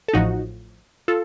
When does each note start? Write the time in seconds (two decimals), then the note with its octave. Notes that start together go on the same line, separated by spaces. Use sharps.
0.08 A4
0.13 A1 A2 F3 D#4 F#4
1.08 F4 A4